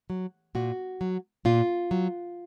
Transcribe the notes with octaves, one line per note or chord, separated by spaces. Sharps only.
F#3
A#2 F#4
F#3
A#2 F4
F#3